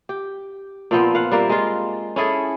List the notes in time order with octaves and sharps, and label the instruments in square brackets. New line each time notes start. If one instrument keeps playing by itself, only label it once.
[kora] G4
A#2 F3 B3 C4
F5 F#5
G3 A#3 E5
G#3 F4
C#4 E4 G#4 A4